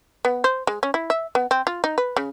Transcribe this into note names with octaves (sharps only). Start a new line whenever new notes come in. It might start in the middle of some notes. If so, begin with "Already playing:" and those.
B3
C5
G#3
C#4
E4
E5
B3
C4
F4
D#4
B4
C#3